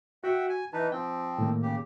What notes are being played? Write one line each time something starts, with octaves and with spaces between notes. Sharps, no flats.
F#4 E5 F#5 G5
G#5
E3 D#4 B4 A5
F3 C4 G5
A2 D#3 A#3
C#3 G4